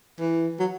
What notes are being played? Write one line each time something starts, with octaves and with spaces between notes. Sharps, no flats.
E3
F#3